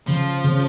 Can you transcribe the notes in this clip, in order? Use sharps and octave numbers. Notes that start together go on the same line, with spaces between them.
C#3 F3
C#3